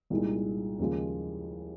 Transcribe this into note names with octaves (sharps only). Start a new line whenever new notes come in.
C2 A#2 G#3 D#4
D#2 C#3 F3 G#3